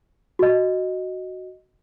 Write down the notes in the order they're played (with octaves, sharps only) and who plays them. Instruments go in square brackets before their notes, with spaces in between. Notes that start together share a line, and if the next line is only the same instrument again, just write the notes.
[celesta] F#4 D#5